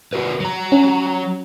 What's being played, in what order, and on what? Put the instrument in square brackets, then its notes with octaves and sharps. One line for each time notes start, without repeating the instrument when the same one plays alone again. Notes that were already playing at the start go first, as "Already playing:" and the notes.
[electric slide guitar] F#4 A#4 B4
F#3 A#5
[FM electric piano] C#4